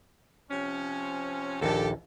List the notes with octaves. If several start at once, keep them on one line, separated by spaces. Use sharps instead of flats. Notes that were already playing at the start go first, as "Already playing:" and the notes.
C3 F3 C#4
A#1 D#2 G4 A4